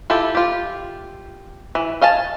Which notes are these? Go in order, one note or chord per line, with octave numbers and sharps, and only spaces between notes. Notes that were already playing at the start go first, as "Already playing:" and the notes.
E4 F4 G4 A4
F4 G4
E3
D#5 F5 G#5 A5